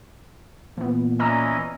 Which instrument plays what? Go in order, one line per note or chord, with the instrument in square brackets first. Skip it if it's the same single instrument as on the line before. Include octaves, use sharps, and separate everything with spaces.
[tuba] A#2 [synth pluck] E3 B3
[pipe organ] E3 C#4 D#5 [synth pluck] D5 A#5 E6